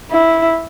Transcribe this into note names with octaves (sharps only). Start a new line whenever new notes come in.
E4